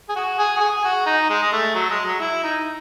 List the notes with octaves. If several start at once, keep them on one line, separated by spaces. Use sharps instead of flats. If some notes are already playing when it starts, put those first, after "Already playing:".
G#4
F#4
G#4
F#4
G#4
F#4
D#4
G#3
G#3
A3
F#3
G#3
F#3
E4
D#4